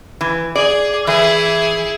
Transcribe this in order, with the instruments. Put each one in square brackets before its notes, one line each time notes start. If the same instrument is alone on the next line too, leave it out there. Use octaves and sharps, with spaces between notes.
[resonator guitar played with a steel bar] E3
[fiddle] G#4 [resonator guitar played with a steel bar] D5
[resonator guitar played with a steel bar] E3 [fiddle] E4 G#4